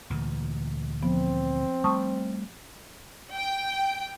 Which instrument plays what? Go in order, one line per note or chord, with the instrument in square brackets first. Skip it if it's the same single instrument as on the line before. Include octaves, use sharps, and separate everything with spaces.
[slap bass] D2 A#2 E3
[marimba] F3 B3 [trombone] C4
[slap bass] G3 A3 [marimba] A5 C#6 D#6
[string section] G5